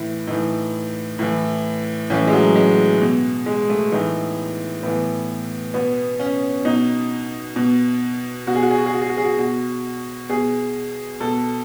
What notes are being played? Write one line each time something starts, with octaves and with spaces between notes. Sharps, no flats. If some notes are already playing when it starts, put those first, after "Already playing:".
Already playing: A2 E3 E4
A2 E3 D#4
A2 E3
A2 E3 C#4
G#3
F#3
G#3
B2
G#3
A3
A2 E3 D#4
A2 E3 B3
B2 B3
C#4
B2 D#4
B2
B2 F#4
G#4
F#4
G#4
F#4
G#4
F#4
G#4
F#4
G#4
F#4
B2 F#4
B2 G#4
B2 A4